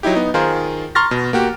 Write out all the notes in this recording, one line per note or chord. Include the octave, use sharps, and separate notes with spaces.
F#3 D#4 E4 G4
B3 D#4
D#3 F4 G#4 A#4 C5
A#5 C6 C#6 F6 A6 A#6
B2
A#3 F#4 G4